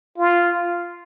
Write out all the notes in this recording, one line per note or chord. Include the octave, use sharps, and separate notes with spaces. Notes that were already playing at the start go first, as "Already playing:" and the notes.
F4